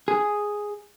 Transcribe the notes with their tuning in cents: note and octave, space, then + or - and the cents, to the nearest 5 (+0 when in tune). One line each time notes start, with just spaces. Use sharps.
G#4 +0